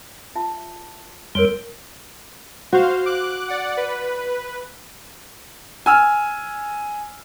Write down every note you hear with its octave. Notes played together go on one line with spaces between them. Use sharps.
F4 E5 A5
F2 G3 A#4 C#5 C6
F#4 C5 F5
D6 F#6
D5 F#5
B4
G#5 E6 F6